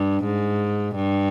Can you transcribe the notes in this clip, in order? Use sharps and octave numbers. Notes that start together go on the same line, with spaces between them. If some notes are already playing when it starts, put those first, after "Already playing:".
Already playing: G2
G#2
G2